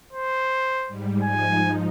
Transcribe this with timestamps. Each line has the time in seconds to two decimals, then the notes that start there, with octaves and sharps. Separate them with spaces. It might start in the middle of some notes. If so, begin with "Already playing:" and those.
0.13 C5
0.88 G#2 G3
1.23 G#2 F3 D#4 G#5